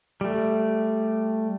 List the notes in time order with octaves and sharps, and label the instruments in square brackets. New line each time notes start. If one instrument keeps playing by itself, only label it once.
[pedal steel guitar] G3 A3